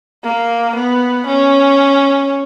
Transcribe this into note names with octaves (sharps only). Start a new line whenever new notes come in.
A#3
B3
C#4